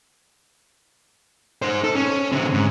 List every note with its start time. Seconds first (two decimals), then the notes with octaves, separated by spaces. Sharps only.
1.62 D#4 C5
1.84 A4
1.96 C#4
2.32 D3 C4
2.53 G#2